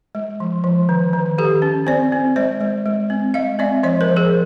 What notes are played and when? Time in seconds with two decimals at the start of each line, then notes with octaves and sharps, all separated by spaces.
0.15 G#3
0.40 F3
0.64 F3
0.89 D#3
1.13 D#3
1.38 D#3 G4 A4
1.62 C#4
1.87 C4 C5 D5
2.12 C4
2.36 G#3 C5 D5
2.61 G#3
2.86 G#3
3.10 C4
3.34 G#3 D#5 F5
3.59 C4 D5 E5
3.83 F3 C#5 D#5
4.01 A#4 C5
4.08 F3
4.16 G#4 A#4